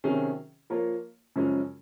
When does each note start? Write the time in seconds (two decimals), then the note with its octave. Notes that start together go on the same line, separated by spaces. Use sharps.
0.04 C3 D#3 F#3 C#4 G#4
0.70 F3 A#3 F4 A#4 C#5
1.36 F#2 C#3 F3 G#3 C#4